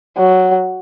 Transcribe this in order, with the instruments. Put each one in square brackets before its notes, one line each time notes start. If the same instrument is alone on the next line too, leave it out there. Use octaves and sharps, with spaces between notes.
[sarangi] F#3